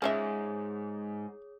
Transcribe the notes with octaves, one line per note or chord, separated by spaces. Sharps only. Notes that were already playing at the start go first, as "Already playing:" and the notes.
G#2 C#4 F4 G#4 C#5 E5 D#6